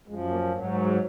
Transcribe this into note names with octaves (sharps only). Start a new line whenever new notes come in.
F#2 F3 G#3
A#3
G#2 F#3 A#3
G#3
A#3
G#3